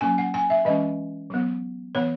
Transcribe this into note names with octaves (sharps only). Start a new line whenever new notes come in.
F#3 A#3 C#4 G#5
F#5
G#5
E5
E3 G#3 C#4 D#5
F#3 B3
E3 B3 C#5